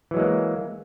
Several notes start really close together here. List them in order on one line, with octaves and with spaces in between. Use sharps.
E3 F#3 G#3 A#3